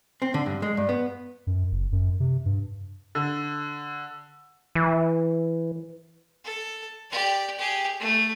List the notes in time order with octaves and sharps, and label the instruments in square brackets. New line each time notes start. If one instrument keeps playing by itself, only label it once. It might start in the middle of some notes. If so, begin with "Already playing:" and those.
[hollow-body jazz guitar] C4
D3
G2
G#3
G2
B3
[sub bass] F#2
F#1
F#2
C3
G2
[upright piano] D3
[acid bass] E3
[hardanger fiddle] A4
G4 D5
G4 G#4
A3